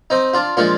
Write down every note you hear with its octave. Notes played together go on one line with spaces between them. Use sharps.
C4 D#4
D4 F4
A#2 F3 G#3 D4 F4